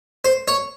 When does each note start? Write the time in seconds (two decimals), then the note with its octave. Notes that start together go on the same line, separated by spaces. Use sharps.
0.25 C5
0.48 C#5